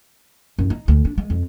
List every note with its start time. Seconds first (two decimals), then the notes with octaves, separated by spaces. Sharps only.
0.59 F#2
0.70 D#4
0.88 D2
1.05 D4
1.18 G#3
1.30 F2